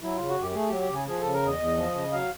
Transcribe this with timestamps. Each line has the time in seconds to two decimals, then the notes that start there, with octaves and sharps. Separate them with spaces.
0.03 F#3 E4
0.16 C#3 F4
0.29 F#4
0.38 F#2 G4
0.50 G4
0.55 A3 G#4
0.68 G4
0.72 F#3
0.81 G4
0.90 C#3 G#4
1.08 F3 G#4
1.21 C#3 A4
1.34 A#4
1.43 E2 D#5
1.59 E2
1.77 F3
1.94 C#3
2.12 F#3 F5